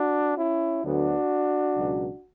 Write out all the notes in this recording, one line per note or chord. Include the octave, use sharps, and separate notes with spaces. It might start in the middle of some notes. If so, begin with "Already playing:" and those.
Already playing: D4 F#4
C#4 E4
D2 D3 F#3 B3 D4 F#4
C#2 B2 F#3